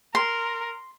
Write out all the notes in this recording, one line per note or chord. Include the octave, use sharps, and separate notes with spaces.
A#4 C6